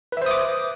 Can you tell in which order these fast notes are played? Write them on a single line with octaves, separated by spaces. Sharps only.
B4 E5 C5 D#6 D6